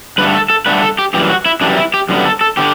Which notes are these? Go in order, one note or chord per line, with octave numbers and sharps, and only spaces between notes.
G2 D3 A3 B4
A4
A4
G2 D3 A3 B4
A4
G4
F#2 E3 G3 G4
F#4
E4
F#2 E3 G3 D4
E4
G4
F#2 D3 G3 B3
A4
A4
D3 G4